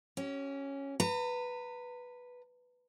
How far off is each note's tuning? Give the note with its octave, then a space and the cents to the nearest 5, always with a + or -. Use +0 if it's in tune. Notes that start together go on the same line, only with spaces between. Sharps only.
C#4 -5 G4 -45
B4 +0 A#5 -40